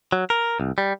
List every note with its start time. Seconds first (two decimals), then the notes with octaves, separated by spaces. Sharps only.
0.12 F#3
0.30 A#4
0.60 C2
0.78 G3